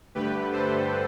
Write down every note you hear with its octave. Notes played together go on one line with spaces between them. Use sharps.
G2 D3 A3 G4 B4
A4 C5